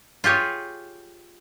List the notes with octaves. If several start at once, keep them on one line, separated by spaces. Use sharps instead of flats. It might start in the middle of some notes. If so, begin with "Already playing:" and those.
F4 G4 G#4 C#5